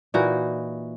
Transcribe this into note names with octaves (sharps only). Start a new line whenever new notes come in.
A#2 E3 D#4 F#4